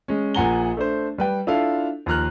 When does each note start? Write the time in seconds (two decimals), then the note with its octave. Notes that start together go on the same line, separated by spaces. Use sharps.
0.08 G#3 C#4
0.35 A#1 A#2 F#5 G#5 A#5 G7
0.77 A3 D4 C5
1.18 G3 B4 G5
1.47 D4 E4 F4 A4 F5
2.06 D#2 F3 A#5 F6 F#6